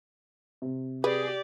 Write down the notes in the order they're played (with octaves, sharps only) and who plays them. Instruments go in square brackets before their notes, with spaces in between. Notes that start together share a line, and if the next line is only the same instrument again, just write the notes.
[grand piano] C3
[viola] G4 D5 [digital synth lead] G#4 [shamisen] B4